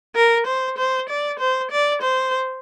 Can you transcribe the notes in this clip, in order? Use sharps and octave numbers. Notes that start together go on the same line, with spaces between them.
A#4
C5
C5
D5
C5
D5
C5